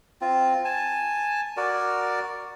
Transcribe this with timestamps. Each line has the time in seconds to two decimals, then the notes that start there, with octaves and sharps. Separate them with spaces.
0.21 C4 F4
0.65 G#5 A5
1.57 F#4 A#4 D5